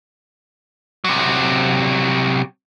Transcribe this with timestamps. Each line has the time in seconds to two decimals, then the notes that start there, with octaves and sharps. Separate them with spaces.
1.04 C3 F#3